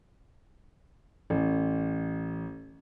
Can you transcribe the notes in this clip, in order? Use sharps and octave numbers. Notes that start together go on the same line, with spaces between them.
A1